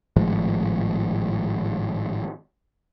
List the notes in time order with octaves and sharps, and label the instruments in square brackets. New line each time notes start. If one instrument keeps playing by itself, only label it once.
[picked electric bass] G#1 A2 F3 G#3